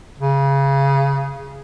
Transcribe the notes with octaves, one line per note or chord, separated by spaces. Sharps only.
C#3